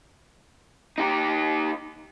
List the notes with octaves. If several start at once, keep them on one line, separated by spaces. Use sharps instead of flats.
D#4 G4